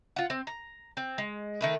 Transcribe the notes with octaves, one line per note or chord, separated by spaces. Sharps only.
F4 F#5
C4
A#5
C4
G#3
D#3 A3 B4